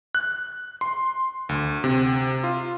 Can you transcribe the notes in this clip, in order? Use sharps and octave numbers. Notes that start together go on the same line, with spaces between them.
F#6
C6
D2
C3
F4